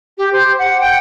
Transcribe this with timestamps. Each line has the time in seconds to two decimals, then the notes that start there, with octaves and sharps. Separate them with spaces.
0.18 G4
0.33 C5
0.59 F#5
0.80 G5